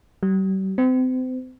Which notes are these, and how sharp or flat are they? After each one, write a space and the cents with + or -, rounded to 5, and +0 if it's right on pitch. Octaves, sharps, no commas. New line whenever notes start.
G3 -40
C4 -35